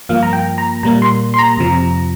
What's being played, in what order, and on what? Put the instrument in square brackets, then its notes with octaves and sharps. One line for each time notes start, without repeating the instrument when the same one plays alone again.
[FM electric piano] G2 F3 A#3 F5
A#5
G5
A#5
A#2 G3 A#3 A#5
C6
C6
A#5
F2 C3 F3